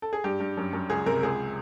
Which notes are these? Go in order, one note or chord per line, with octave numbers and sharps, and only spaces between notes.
A4
G#4
G2 G4
G2
F#2
F#2
C#2 G#4
C3 A#4
C#2 G#4